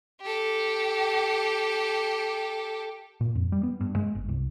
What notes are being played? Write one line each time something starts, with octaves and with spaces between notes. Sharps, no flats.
G4 A4
A#2
F2
G3
B3
G2
G#3
G1
C2